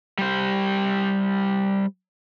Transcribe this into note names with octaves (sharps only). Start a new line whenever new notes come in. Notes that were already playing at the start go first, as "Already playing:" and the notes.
G3 C5